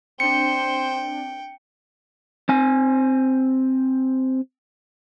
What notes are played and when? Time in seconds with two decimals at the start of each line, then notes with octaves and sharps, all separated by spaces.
0.20 C4 D4 C5 G5 C#7
2.49 C4 G#5